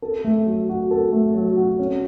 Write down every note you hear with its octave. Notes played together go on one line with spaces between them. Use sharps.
A4
A3
F#3
F#4
A4
A3
F#3
F#4
C#4